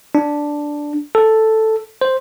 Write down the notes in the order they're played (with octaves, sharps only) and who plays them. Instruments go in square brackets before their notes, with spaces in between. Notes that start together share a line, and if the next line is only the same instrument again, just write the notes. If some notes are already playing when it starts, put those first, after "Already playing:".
[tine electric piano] D4
A4
C5